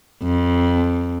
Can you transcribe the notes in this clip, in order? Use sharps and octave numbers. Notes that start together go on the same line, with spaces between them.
F2